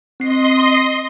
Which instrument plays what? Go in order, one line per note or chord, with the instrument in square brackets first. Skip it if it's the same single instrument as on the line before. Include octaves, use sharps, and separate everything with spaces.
[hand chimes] C4 C7 [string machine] D#5 C6